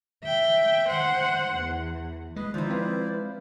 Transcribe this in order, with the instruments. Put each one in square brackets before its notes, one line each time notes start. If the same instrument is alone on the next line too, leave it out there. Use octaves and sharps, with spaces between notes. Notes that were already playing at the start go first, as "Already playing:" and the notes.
[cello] E5 G5
C5 F#5
E2
[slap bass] G#3 [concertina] B4 D#5
[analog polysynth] D#3 [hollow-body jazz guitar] F3 D#4 [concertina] E4 C5 D5
[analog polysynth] C4 B4 F5